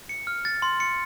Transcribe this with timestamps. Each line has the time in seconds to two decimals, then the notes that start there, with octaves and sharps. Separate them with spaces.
0.09 C#7
0.27 F6
0.45 A6
0.62 C6
0.80 C#7